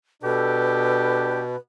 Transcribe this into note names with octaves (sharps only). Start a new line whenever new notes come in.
B2 D4 G4 A4 B4